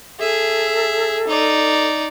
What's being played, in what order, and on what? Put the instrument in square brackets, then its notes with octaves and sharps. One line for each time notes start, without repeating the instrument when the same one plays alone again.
[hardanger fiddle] G#4 E5 [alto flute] A4
[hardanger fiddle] D#4 D5